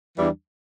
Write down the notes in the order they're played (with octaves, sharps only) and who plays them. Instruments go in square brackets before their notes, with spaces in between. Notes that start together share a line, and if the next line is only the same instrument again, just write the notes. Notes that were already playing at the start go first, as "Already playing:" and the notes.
[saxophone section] E2 E3 G3 D4